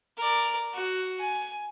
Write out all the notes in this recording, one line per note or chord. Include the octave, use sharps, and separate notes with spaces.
A#4 D5
F#4
G#5